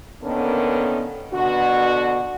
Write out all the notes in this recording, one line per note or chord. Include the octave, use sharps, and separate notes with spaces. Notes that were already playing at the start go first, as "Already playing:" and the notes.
D3 D#3 A#3 B3 C#4 A4
B2 D3 F#4